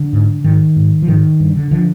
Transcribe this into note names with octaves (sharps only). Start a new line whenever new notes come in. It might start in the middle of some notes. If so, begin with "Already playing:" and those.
Already playing: D3
G#2
G#2 D#3
G#2
F3
G#2 D#3
G2
D3
D3 F3